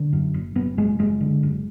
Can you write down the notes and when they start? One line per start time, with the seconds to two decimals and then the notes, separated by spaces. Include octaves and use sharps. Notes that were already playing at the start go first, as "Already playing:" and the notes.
Already playing: D3
0.13 F#2
0.34 F#1
0.55 F#1 B3
0.78 F#1 G#3
0.99 F#1 G#3
1.21 D3
1.43 F#1